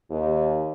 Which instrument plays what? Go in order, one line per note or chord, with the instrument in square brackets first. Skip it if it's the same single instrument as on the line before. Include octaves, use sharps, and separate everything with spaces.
[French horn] D#2